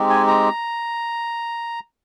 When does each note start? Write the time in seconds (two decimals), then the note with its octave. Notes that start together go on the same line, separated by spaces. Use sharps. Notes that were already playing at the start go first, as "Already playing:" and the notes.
Already playing: G#3 C4 D#4 G4
0.10 G#5
0.27 A#5